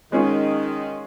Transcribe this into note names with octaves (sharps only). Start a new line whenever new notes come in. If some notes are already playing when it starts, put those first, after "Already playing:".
D#3 G#3 C#4 F4